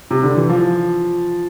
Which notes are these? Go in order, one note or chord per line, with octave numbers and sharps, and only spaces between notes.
C3
D3
E3
F3